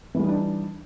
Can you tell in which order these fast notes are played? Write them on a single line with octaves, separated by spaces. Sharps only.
E3 G3 D#4 D4